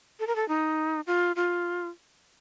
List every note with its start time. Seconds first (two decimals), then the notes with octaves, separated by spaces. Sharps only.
0.20 A4
0.27 A#4
0.36 A4
0.48 D#4
1.07 F4
1.36 F4